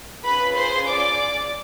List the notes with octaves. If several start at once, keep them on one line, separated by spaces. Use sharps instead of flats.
C#4 F4 G#4 B4 B5
C5 C6
D5 D6